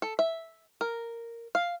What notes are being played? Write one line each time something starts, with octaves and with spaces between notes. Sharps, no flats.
A4
E5
A#4
F5